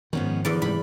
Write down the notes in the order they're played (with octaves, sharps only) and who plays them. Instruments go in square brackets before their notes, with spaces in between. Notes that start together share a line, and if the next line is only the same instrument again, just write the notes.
[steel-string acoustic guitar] G#2 B3 C#4 [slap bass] D#3 F3
[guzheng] E2 D5 [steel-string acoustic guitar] D3
[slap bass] G#2 C3 G3 [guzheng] B5